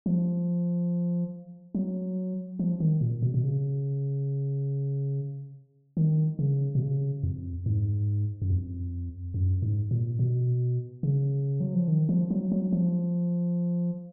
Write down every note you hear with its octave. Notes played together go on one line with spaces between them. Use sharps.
F3
F#3
F3
D#3
A#2
B2
B2
C#3
D#3
C#3
B2
C#3
F2
G#2
F#2
F2
F#2
G#2
A#2
B2
C#3
F#3
F3
D#3
F3
F#3
F#3
F3